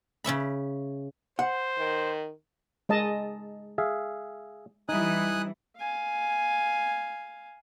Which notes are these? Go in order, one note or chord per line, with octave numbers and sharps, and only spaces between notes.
C#3 C#4 E5 B5
C5 F#5
D#3
G#3 D#5 A5
G#4 E5 F5
E3 G3 D#4 E4 G#5 D#6 F#6
F5 G#5